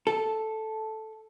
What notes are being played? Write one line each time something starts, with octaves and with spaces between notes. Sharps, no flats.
A4